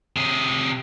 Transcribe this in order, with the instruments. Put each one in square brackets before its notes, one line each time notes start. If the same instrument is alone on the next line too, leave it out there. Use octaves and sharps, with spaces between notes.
[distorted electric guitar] C3 G#4